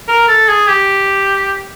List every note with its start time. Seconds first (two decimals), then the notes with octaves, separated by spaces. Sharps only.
0.08 A#4
0.28 A4
0.48 G#4
0.67 G4